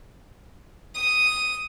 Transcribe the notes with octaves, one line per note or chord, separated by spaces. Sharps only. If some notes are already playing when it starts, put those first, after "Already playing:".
D#6